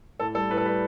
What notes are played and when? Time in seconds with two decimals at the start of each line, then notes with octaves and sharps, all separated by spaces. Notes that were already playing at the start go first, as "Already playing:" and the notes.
0.20 A2 A4
0.35 G3 A4
0.50 A2 B4
0.57 A4
0.65 G3 B4